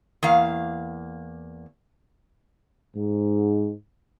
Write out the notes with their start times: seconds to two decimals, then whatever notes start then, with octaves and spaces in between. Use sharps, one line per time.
0.23 E2 A#3 F5
2.96 G#2